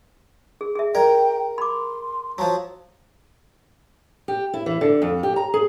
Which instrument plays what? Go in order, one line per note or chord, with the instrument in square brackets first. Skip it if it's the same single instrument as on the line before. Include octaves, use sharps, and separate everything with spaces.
[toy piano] G#4
G#4 E5
[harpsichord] A#4 [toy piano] D5 [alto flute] G5
[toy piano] B5 D6 [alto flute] C6
[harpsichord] F3 F#3 [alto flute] A5
[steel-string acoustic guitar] G4
E4
E3
D3
F2
G4
A#5
G#4